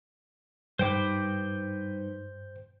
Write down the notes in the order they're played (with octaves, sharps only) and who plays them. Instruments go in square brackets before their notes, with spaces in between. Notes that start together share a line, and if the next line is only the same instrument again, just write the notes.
[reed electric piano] G2 [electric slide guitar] G3 D#4 B4 [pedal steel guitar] C5 G5 D6